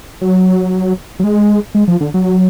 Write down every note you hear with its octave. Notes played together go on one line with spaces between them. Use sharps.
F#3
F#3
G#3
G#3
F3
D3
F#3